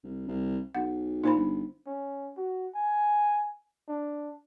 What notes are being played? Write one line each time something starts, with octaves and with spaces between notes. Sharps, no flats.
C2
C2
B1 F#5
A#2 D#4 C5 B5
G1
C#4
F#4
G#5
D4